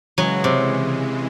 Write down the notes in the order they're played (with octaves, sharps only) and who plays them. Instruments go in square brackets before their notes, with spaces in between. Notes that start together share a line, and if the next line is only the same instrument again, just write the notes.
[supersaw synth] C#3 E3 G#3 [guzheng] F#3
[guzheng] C3